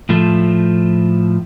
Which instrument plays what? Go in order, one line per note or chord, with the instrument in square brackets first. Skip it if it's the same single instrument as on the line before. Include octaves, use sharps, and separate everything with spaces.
[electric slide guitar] A2 F3 A3